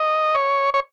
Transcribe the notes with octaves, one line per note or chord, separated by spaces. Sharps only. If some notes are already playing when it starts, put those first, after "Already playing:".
Already playing: D#5
C#5
C#5